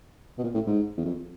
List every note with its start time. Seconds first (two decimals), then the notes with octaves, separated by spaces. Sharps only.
0.38 B2
0.44 A#2
0.55 A2
0.66 G#2
0.98 E2
1.05 F2